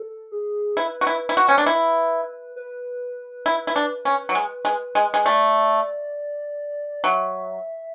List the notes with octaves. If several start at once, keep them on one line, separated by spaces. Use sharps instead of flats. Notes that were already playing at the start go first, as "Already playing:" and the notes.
Already playing: A4
G#4
E4 B4
F#4
E4
E4
F#4
C#4
D4
E4
B4
E4
E4
D4
C#4
F#3
G#3
G#3
G#3
G#3
A3 D5
F#3 E5